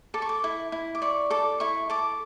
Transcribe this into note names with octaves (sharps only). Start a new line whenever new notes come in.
A4 D6
C#6
D6
E4
E4
D6
D5 C#6
A4 D6
E4 C#6
A4 D6